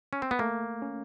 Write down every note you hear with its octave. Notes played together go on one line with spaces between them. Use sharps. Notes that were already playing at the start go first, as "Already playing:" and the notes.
C#4
C4
B3
A3 A#3
C#4